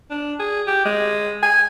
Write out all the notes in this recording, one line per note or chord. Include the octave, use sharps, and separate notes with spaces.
D4
G#4
G4
G#3
G#5